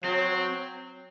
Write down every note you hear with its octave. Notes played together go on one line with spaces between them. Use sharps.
F#3 C4